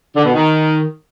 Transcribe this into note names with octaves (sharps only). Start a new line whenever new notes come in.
D3
B2
D#3